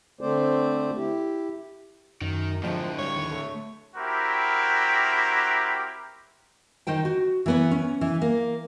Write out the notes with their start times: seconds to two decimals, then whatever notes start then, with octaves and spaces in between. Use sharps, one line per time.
0.21 D3 A3 C4 C5 D5
0.97 E4 G4
2.21 F#2 D#3
2.63 A2 D3 F3 G#3
2.98 G2 C#5
3.16 D#2
3.31 A3
3.96 C4 E4 F#4 G4 A#4
6.87 D#3 D#4 C5 G5
7.05 F#4
7.46 E3 B3 C#5
7.71 C#4
8.01 E3
8.22 A#3